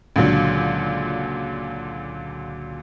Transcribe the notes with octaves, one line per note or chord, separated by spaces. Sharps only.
C#2 A#2 D3 F#3